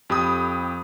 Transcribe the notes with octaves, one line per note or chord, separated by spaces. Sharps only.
F2 G4 B5 D#6